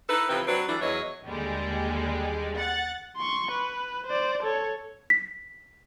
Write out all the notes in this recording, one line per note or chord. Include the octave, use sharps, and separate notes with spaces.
D#4 E4 A4 B4
C3 E3 F3 C4 B4
F#3 C4 D4 F#4 B4
E3 G3 A3 D4 E4
E2 E3 F#3 C#5 D#5
D#2 D3 G3 G#3
F#5 A6
C6 C#6
B4
C5 D5
A4 C#5
B6